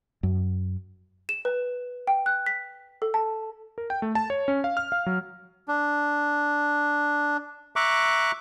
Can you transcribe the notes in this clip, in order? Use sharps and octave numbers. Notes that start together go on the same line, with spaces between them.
F#2
E7
B4
G5
F#6
B6
A4
A5
A#4
G5
A3
A5
C#5
C#4
F5
F6
F5
F#3
D4
E5 A#5 C#6 D6 F#6